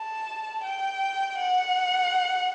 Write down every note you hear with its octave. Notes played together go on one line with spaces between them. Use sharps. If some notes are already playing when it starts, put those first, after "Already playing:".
Already playing: A5
G5
F#5